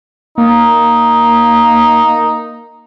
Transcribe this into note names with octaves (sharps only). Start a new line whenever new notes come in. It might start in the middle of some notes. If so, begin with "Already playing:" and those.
A#3 D#4